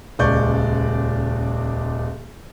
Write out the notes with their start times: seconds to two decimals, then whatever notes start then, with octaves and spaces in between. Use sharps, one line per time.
0.19 D#1 C#2 D5 C#6 G6